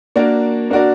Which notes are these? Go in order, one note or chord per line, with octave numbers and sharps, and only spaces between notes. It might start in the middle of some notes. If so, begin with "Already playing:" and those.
A#3 D4 F#4 A#4 D5
A#3 D4 F#4 A#4 D5